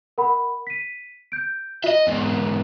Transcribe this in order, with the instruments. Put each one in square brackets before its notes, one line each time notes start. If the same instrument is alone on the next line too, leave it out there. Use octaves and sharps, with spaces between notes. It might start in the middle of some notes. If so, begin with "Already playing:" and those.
[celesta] A#4 F#5 B5
B6 D#7
G6 D7
[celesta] F4 [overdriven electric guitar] D#5 E5
[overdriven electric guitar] E2 G#2